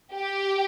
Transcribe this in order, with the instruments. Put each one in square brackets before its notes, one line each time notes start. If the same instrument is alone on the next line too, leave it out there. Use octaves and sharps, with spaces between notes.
[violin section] G4